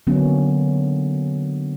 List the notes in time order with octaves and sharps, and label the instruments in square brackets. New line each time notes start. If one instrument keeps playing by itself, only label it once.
[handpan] D3 F#3 A#3 B3 C#4